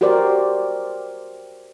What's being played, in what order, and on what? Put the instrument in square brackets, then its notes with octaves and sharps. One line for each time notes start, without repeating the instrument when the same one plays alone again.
[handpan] F#4 G4 A#4 C5 D5